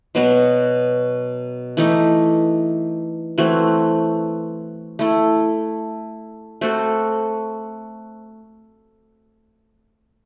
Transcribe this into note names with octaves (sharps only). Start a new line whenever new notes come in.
B2 F#3 B3 F#4
E3 A3 D#4
E3 A3 C4 F#4
A3 E4 A4
A3 C4 F#4 A4